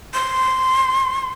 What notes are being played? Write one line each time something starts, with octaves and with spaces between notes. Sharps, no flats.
C6